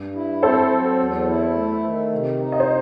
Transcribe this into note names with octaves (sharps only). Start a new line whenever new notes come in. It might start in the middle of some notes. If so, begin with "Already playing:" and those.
Already playing: G2
E4
C4 A4 C5
F#3
E2
E4
A3
D#3
C3
D#4
D#5
C5